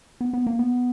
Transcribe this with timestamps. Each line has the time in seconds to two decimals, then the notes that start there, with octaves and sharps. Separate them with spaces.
0.21 B3
0.33 B3
0.47 A#3
0.59 B3